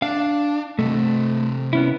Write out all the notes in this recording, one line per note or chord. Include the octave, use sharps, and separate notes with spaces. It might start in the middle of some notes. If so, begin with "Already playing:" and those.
D4 F5
C3 A3 D#5
B3 C#4 E4